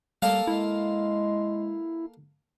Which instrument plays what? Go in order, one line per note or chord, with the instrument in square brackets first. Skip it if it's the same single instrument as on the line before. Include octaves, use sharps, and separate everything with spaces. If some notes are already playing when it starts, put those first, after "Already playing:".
[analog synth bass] G3 [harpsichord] A#3 A4 F5
[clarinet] G#3 [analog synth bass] E4